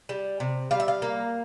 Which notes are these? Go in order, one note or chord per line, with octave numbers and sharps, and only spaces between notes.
G3
C3
G3 F5
E5
F5
A#3